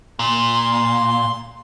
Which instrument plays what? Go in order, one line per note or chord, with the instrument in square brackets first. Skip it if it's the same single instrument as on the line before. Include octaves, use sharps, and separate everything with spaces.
[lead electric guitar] A#2 [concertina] C6